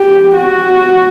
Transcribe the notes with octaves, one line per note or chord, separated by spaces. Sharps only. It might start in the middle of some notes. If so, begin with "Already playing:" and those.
Already playing: G4
F#4